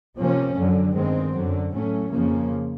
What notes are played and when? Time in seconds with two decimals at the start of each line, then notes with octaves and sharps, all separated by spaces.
0.15 C3 F3 A#3 C#4
0.55 F#2 D3 F#3
0.93 G2 D#3 G#3 C4
1.32 F#2 D3 F#3
1.72 A2 F#3 A3 C#4
2.10 F2 C#3 F3 A#3 C#4